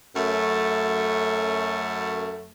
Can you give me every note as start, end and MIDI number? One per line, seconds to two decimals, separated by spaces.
0.16 2.52 42
0.16 2.52 57